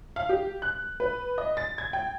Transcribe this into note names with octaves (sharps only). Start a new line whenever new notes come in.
F5
G4
F#6
B4
D#5
A6
G#6
G5